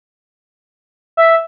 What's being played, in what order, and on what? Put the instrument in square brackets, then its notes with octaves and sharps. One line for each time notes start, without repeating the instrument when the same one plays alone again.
[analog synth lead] E5